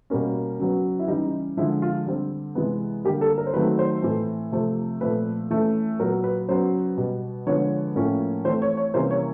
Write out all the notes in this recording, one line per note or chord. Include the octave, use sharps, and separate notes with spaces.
B2 G3 A#3 C#4
C#3 F#3 B3
E4
C#3 E3 G3 D#4
D3 F3 G#3 E4
F4
D3 G3 C4
C3 E3 G#3 B3
D3 G3 A#3 G4
A4
A#4
C5
D#3 F#3 A3 C4 B4
C5
A2 E3 A3 C4
C3 F3 A3 C4
A#2 F3 A3 C4 B4
E3 A3 C#4
A#2 F#3 B3 A#4
B4
C#3 F#3 B3 C5
B2 G3 B3
D3 F3 G#3 B3 C#5
A2 F3 A#3 C#4
E3 A3 C4 C5
C#5
C#5
C3 E3 G3 A#3 C#4 C5
C#5